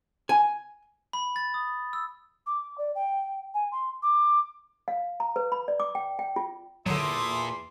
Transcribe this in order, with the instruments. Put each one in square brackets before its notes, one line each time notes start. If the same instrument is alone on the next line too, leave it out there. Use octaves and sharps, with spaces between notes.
[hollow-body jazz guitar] G#5
[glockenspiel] B5
A6
D#6
E6
[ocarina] D6
D5
G5
G#5
C6
D6
[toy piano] F5
A#5
B4
B5
D5
D6
G5
G5
F4
[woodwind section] E2 C6 [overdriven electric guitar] A#2 [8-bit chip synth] D3 F#3 [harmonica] E4 A4 D#6